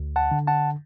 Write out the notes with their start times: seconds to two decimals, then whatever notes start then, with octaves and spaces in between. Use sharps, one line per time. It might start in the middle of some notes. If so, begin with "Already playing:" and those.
Already playing: D2
0.16 F#5 A5
0.31 D3
0.47 F#5 A5